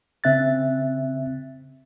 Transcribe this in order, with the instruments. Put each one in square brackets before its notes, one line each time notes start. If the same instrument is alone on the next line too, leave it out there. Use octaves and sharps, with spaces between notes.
[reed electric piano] C#3 C4 E5 F#6 A6